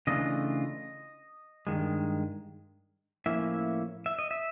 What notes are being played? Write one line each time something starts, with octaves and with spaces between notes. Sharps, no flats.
C#3 E3 A3 D4 F4 D#5
G2 D#3 G#3
A2 F3 A#3 C#4 E4 E5
E5
D#5
E5